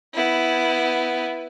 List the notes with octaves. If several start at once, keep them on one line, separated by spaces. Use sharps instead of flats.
B3 E4